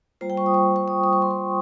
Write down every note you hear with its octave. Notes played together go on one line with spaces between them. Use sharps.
G3 A#3 F4 C5
G5
C#6
D#6
C#6
C#6
D#6
D#6
C#6
C6
C#6